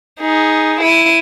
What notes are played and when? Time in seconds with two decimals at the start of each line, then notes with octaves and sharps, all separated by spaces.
0.20 D#4 G#4
0.81 E4 D#7